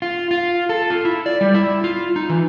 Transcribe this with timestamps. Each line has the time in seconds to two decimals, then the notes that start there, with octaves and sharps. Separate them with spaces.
0.02 F4
0.31 F4
0.69 A4
0.90 F4
1.05 E4
1.26 D5
1.41 G3
1.54 E4
1.84 F4
2.16 D#4
2.30 E3